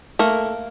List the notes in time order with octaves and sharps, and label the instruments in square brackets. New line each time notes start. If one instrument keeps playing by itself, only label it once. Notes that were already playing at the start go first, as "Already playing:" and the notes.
[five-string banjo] A3 A#3 A#4